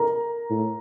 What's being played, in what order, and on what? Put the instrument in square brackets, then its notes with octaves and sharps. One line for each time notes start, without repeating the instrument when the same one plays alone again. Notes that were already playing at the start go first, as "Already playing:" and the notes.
Already playing: [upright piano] A#4 A#5
[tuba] A2